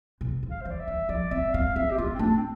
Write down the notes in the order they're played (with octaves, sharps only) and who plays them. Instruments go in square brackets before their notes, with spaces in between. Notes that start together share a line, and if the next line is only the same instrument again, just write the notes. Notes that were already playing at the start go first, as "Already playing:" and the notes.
[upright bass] B2
D3
[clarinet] F5
[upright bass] E3 [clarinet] C5
[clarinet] D5
E5
[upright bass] E3
[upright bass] F3 [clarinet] D5
[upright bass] C4 [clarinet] E5
[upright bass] C4 [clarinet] F5
[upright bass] C4 [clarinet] E5
[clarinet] G4
[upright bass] B3 [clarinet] F4
[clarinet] C4
[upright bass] A3 [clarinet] D4
[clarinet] C4